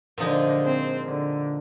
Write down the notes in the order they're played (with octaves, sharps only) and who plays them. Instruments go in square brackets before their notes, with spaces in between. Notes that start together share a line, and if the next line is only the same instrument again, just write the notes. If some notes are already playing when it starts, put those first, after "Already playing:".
[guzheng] A#2 F3 G#3 D#4 G#4 [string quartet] D3
[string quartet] C4
D3